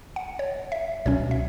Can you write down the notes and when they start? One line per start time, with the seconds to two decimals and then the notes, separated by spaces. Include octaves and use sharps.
0.16 F#5
0.39 C#5
0.72 E5
1.06 C#2 B2 F#3 C#4 C#5
1.31 E5